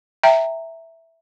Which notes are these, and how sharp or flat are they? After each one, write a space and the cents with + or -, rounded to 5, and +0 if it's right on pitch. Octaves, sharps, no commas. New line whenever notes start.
E5 +0 G5 +0 A#5 -10